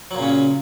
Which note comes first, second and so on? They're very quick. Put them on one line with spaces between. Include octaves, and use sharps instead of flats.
F#3 A#2 C#3 C#4